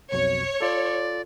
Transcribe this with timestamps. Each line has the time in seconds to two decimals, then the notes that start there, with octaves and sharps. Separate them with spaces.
0.12 B1 F2 B2 C#5
0.61 F4 A4 D5